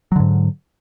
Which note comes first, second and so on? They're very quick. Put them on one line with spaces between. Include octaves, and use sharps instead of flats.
F#3 D3 G#2